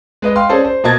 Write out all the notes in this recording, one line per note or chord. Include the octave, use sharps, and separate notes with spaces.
G#3 B4 D#5
F5 G5 C6 F6
C#4 G#4 A4 C5 D5
C5
B2 A#3 D#5 A5 G#6 A6